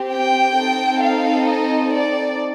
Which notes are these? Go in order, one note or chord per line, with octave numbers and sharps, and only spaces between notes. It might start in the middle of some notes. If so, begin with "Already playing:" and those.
Already playing: C4 G4
G5
C4 D#4 A4
F5
D#5
D5